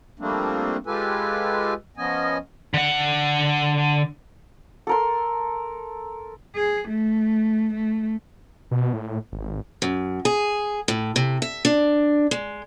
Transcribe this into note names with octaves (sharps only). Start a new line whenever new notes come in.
F3 G3 A3 A#3 C4 D4
G#3 F4 G4 A4 B4 G#5
F3 B3 C#4 D#5 G#5
D3 F#5
A4 A#4 C6
G#4
A3
A3
B2
A2
G#1
F#2
G#4
A2
C3
E5
D4
G#3